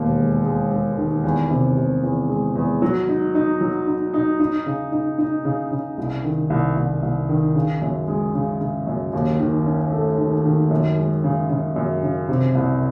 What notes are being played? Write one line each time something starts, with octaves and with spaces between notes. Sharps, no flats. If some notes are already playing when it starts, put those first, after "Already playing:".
Already playing: E1 D#2
G#3
G#3
G#3
D#3
E2
C3
C3
E2
G#3
E2
F#3
D#4
D#4
F#3
D#4
D#4
D#4
C#3
D#4
D#4
C#3
C#3
C2
D#3
C2
C2
C2
D#3
C#3
F#2
G#3
C#3
C#3
F#2
D#2
D#3
C#4
A3
D#3
D#3
F#2
G#3
C#3
C#3
F#2
C#3
C3
C2